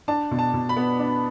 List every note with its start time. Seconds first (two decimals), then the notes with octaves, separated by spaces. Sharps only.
0.08 D4 A5
0.31 B2
0.39 A5
0.54 B2
0.69 B5
0.76 B3
0.99 D4